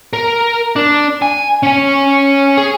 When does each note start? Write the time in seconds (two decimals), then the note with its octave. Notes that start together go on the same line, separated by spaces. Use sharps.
0.13 A#4
0.76 D4
1.22 G#5
1.63 C#4 G#5
2.57 G#4